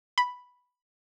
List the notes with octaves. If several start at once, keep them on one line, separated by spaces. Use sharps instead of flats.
B5